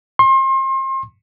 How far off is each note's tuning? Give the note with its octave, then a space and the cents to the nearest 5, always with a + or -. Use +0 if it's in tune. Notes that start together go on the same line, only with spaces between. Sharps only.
C6 +35